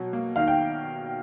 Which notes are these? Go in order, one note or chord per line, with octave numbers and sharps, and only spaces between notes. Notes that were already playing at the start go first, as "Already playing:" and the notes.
Already playing: B2 F#3
A#3
D#3 F5
G5